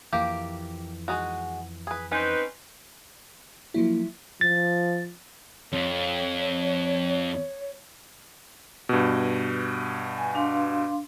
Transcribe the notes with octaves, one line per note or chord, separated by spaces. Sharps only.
F2 E3 A#3 G4
G#3 D#4 F#4
G#4 B4
C4 C#4 D#4 B4
F3 F#3 A#3 E4
F3 A6
F2 C#5
G2 B2
G#5
D4 F5 C6